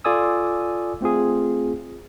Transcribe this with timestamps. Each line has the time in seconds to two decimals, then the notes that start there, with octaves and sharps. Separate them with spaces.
0.04 F4 A4 D5 G#5 D#6 E6
1.01 A3 C4 F4 G#4